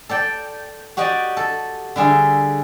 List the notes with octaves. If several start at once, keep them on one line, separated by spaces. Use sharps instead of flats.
A4 D5 G5
F#4 G4 D5 D#5
A4
D3 G3 G#4 E5